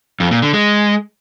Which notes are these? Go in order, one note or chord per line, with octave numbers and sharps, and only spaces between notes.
F2
A#2
D3
G#3